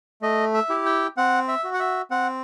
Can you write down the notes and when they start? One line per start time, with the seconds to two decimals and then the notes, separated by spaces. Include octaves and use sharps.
0.22 A3 D#5
0.54 E5
0.69 E4 G4
0.86 G5
1.17 C4 F#5
1.48 E5
1.64 F#4
1.74 F#5
1.80 E5
2.11 C4 F#5